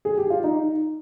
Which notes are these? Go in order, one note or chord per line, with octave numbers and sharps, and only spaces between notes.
G#4
G4
F4
D#4